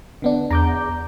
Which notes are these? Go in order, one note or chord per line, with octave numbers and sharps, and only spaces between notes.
D3 B3 D4
E2 A#5 D6 G6